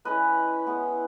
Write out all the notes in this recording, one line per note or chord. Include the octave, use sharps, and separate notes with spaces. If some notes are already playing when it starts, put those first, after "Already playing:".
G#3 C#4 E4 B4 D#5
G#3 B3 E4